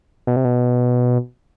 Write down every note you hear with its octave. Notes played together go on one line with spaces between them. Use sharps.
B2
C3
B2